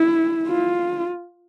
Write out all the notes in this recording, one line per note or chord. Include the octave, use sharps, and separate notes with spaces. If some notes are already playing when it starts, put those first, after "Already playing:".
Already playing: E4
F4